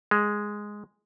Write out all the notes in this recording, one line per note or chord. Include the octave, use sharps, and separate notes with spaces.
G#3